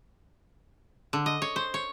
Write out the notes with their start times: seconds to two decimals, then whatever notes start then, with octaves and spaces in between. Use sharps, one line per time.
1.13 D3
1.26 D#5
1.42 C#5
1.56 C5
1.74 C#5